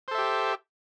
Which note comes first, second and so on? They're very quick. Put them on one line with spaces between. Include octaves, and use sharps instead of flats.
C5 A4 E5 G4